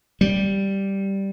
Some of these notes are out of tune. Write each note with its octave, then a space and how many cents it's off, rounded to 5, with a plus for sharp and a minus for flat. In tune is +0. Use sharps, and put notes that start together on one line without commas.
G3 -5